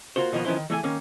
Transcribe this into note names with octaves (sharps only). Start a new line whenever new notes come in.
A#3 F4 F#4 C5
B2 D#3 F3 A#3 B3
D#3 F3 B3 C#4 E4 C5
D#3
E3 A3 G#4 G#5
D#3 A#3 C#4